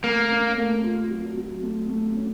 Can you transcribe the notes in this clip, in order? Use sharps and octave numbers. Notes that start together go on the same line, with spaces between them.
A3 A#3
C#4
A3
F4
F#3
F#3
A3
A3
C#4